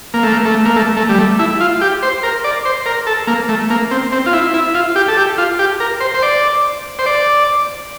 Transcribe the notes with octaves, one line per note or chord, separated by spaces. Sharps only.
A#3
A3
A#3
A3
A#3
A3
A3
G3
A3
E4
F4
G4
C5
A#4
D5
C5
A#4
A4
A#3
A3
A#3
C4
C4
F4
E4
E4
F4
G4
A4
G4
F4
G4
A#4
C5
C5
D5
C5
D5